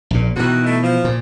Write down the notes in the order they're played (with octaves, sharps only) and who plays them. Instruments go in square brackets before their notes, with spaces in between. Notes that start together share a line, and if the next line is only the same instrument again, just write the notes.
[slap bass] A#1 A#2
[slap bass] B2 E3 [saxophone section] D#3 F#4
[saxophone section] A3 D#4 E4
F3
[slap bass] A#2